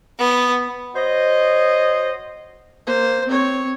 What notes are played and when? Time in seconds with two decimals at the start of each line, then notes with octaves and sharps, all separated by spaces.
0.19 B3
0.95 F#4 C5 C#5 D#5
2.86 A#3 C5
3.27 C4 C#5